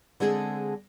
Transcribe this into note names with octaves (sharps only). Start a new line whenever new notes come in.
D3 G#3 C4 G#4 A4